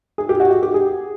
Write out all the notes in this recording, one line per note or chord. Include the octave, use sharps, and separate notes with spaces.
G#4
G4
F#4
F#4
G4
G#4